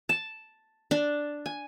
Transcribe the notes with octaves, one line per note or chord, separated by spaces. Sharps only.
A5
D4
G#5